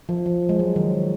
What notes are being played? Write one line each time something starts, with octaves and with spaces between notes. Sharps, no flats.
F3
F3
G#3
F#3
D#3